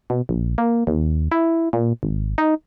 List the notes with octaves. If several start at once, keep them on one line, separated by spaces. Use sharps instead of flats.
B2
A#1
A#3
D#2
E4
A#2
G#1
D#4